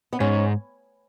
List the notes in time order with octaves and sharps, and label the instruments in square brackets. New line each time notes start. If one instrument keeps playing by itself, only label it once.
[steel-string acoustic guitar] B3
[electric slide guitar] G#2 [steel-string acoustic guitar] C#4